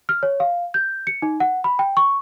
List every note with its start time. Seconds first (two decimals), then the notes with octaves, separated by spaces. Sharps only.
0.09 F6
0.23 C#5
0.40 F5
0.74 G6
1.07 C#7
1.22 D#4
1.40 F#5
1.64 B5
1.79 G5
1.97 C#6